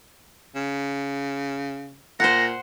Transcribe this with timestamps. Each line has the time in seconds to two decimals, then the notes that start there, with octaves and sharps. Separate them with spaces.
0.55 C#3
2.20 A#2 C5 F#5 A#6